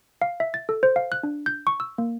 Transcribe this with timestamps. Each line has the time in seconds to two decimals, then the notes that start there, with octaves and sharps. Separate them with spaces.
0.22 F5
0.40 E5
0.54 A6
0.69 A4
0.83 C5
0.96 F5
1.12 F#6
1.23 D4
1.46 G6
1.67 C#6
1.80 E6
1.98 A#3